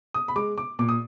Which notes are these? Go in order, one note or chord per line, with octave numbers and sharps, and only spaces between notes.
D#6
B5
G#3 D6
D6
A#2 D6
D#6